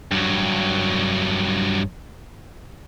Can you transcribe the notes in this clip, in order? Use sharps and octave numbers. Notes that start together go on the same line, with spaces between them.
G2 F#3